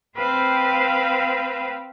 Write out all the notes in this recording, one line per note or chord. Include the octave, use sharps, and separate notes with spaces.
C4 B4 C5 F5 G5 B5